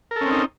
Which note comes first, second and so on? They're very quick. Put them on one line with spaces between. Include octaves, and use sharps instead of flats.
A#4 A4 C#4 C4 D#4